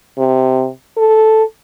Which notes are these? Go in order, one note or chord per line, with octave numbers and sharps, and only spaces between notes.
C3
A4